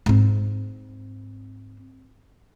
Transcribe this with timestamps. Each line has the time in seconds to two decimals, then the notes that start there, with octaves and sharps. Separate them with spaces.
0.06 G#2 C4